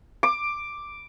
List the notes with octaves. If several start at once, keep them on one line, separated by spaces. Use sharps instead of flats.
D6